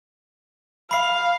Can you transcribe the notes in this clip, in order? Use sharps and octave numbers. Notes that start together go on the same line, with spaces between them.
F5 B5 C7